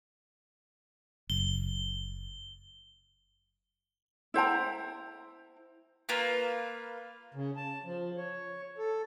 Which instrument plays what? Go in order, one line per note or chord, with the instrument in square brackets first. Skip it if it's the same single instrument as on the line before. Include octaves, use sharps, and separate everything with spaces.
[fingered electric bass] F#1 [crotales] G7
[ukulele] E4 C5 G5 A#5
[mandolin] A#3 F4 B4
[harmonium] C#3
A5
F3
C#5
A4